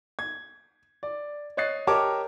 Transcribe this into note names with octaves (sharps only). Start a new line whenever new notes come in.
G#6
D5
C#5 D#5 F#6 A6 C7
G4 A#4 C#5 D#5 A5 D6